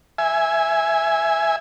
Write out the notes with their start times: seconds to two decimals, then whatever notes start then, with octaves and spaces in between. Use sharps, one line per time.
0.18 E5 G#5